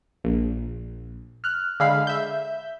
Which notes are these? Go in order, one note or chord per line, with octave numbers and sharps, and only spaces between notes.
A#1
F6 F#6
D3 G#3 F5 B5 C7
E5 G6